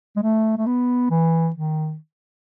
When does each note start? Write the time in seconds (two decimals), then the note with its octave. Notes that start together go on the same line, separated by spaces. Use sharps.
0.16 G#3
0.22 A3
0.58 A3
0.66 B3
1.10 E3
1.55 D#3